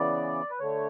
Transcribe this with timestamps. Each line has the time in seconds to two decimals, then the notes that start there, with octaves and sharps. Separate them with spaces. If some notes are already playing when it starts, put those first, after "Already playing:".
Already playing: C#3 E3 B3 D5
0.50 B4
0.60 D3 A3 C#5